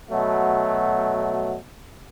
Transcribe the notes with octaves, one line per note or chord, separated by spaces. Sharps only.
B2 F#3 A3